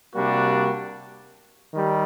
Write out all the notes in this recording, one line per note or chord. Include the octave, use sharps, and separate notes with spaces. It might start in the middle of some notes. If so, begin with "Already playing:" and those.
C3 G3 A#3 D4 F#4
D#3 G3